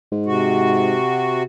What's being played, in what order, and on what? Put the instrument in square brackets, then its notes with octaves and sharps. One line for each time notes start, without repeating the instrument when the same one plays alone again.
[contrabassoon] G#2
[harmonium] C3 F#4